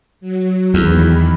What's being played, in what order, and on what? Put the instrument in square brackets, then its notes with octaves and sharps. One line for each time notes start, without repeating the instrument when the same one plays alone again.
[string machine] F#3
[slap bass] E2 [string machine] D#3 E3 B5